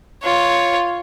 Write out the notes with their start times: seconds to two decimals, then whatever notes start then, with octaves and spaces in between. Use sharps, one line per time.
0.23 F4 C#5